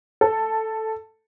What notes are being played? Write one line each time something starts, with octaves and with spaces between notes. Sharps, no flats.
A4